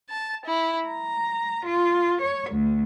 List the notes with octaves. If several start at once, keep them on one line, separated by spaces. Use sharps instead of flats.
A5
E4
A#5
F4
C#5
D2